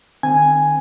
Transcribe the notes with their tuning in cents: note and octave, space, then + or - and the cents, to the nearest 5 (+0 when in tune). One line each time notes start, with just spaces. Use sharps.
D#3 -45 C4 +0 G#5 +0